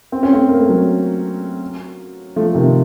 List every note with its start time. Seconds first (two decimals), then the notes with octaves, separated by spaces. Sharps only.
0.12 C4
0.23 C#4
0.33 A3 C4
0.49 A#3
0.59 A3
0.70 F#3 A#3
2.36 F3 A3
2.55 C3 D#3